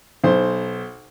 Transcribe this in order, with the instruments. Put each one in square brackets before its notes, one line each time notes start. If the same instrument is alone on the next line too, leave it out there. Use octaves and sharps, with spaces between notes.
[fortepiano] B1 C5